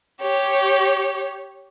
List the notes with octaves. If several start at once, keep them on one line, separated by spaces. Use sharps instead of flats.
G4 C#5